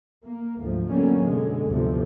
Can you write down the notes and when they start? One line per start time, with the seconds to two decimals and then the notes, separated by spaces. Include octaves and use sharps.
0.24 A#3
0.58 D2 G#2 F3
0.88 B2 D3 F#3 G3 A#3 C#4
1.20 F#2 B2 D3 G#3
1.66 G1 D2 A2 C3 F3